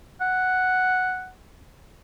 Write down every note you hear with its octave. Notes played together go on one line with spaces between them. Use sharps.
F#5